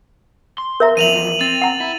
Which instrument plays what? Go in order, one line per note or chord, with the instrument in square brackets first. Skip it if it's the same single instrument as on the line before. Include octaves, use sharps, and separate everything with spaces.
[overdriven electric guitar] C6
[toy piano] A#4 E5 A#5
[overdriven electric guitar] E2 F3 [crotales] D#7 F7 F#7
[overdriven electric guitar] C4 [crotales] A6
[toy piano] F#5 A#5
[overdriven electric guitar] E4